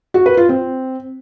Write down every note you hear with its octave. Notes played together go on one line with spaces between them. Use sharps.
F#4
B4
F4
C4